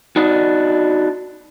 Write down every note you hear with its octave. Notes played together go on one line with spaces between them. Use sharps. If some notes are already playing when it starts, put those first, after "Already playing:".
D4 D#4 F#4